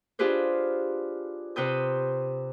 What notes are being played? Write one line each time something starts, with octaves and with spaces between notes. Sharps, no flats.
D4 F4 G4 G#4 B4 C5
C3 B4 C5 G5 D#6 G6